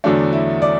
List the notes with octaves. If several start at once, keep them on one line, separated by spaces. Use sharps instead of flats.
E2 D3 F#3 A3 D4
E4
D5